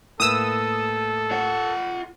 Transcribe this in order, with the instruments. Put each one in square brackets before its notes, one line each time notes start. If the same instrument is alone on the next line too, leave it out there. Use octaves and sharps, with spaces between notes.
[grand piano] A2 A#3 B4 [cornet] A4 [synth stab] D#6 E6
[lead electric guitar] F4 F#5